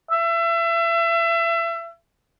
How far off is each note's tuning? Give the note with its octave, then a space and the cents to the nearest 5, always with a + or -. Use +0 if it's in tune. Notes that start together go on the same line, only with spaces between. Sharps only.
E5 +30